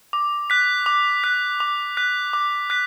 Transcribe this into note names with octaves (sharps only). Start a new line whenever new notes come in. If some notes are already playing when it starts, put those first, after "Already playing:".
D6
F#6 B6
D6
F#6 B6
D6
F#6 B6
D6
F#6 B6